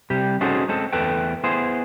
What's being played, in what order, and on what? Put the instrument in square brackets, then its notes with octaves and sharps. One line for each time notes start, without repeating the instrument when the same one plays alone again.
[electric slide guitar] C3 G3 G4
C#4 D#4 F#4 G#4 A4 C5
G#3 C4 A4
E2 A3 A4 B4 G5
B3 E4 G#4 C5